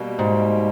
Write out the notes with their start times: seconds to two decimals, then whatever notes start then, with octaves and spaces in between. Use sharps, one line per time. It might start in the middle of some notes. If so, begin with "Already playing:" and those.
Already playing: B2 G3 A#3
0.19 G#2